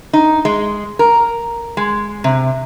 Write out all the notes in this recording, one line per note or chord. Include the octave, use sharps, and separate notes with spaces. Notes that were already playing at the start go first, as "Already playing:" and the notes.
D#4
G#3
A#4
G#3
C3